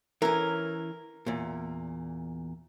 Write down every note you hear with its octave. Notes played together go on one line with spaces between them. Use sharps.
E3 C#4 A#4
E2 A#2